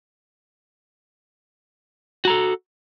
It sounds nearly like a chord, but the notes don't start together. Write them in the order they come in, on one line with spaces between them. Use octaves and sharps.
F#4 A#5 A4